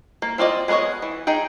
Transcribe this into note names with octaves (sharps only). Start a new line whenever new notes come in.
A#3
C4 F4 D5 D#5
G#3 B3 A#4 C#5 D#5
E3
D#4 G#4 G5